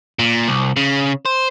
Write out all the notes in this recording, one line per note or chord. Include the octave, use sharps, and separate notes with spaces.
A#2
C2
C#3
C5